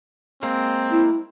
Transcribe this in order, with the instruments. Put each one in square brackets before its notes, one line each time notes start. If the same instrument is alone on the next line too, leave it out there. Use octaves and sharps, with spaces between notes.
[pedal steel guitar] G#3 A#3 [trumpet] C4
[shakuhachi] E4